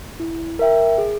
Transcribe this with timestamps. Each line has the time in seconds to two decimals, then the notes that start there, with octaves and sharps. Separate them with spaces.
0.20 E4
0.59 A#4 E5 G5
0.98 G#4